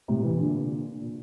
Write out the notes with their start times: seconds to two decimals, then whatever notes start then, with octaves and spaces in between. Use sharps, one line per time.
0.08 A2 C3
0.23 C3 E3
0.33 C3
0.38 A#2 D3
1.00 A#2